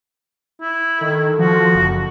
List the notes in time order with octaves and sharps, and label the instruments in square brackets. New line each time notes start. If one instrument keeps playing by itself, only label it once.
[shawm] E4
[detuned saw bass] D#3 [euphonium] A4
[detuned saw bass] F3 [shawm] F#4
[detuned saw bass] F#1